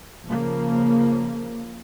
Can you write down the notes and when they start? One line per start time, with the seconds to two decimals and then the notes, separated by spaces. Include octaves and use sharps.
0.23 C#3 F3 A#3